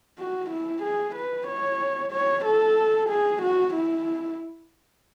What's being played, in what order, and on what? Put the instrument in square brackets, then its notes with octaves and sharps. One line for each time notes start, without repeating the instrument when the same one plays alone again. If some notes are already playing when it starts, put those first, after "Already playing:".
[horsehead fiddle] F#4
E4
G#4
B4
C#5
C#5
A4
G#4
F#4
E4